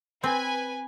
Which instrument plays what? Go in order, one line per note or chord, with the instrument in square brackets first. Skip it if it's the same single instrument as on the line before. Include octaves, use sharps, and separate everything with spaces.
[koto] C4 [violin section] B4 G#5